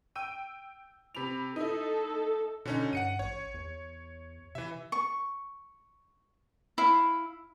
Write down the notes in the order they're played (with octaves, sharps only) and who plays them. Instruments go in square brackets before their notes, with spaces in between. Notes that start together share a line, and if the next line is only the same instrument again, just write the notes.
[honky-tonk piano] G5 E6 D#7
C3 B5 F7
[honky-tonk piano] D#4 E4 [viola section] A4
[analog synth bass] B2 [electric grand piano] D3 C#4 D#4
[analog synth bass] G2 [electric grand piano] F#5 C#7 D#7
[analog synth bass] A1 [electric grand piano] C#5
[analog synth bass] E2
[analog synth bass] C3 [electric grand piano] E3 E5
[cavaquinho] C#6
E4 F5